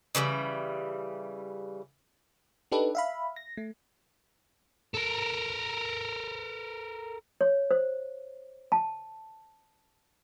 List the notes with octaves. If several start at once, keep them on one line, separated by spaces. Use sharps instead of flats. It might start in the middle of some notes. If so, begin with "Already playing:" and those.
C#3 E3 F#3 G3
D4 D#4 G4 A4 B4
E5 F5 B5
A#6
A3
A4 A#4
C#5
C5
A5